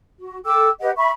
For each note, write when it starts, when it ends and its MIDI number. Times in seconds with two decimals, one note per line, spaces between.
0.18 0.39 66
0.45 0.68 69
0.45 0.68 79
0.45 0.68 86
0.45 0.68 88
0.80 0.90 67
0.80 0.90 71
0.80 0.90 75
0.80 0.90 78
0.96 1.10 76
0.96 1.10 83
0.96 1.10 85